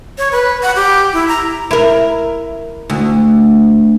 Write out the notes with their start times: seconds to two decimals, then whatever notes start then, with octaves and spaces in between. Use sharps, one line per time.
0.18 C#5
0.32 B4
0.63 F#5
0.76 G4
1.13 E4
1.28 A#5
1.71 E4 A#4
2.90 D2